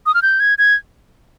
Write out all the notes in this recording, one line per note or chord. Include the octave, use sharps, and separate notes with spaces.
D#6
F6
G6
G#6
G#6